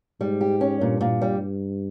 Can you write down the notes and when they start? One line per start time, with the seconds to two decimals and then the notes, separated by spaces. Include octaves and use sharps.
0.20 G#2 G3
0.41 G4
0.61 C#4
0.81 G2 A#2
1.01 A#2
1.22 G3